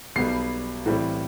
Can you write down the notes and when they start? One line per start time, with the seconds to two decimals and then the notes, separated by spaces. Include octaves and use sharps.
0.15 B1 B2 G3 B3 C7
0.86 A2 E3 G3 C4